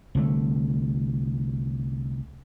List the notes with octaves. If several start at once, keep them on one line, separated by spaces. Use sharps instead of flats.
C2 D3 A3